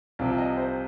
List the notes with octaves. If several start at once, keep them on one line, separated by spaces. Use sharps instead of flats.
C2 C3 F3 F5
D#5
C5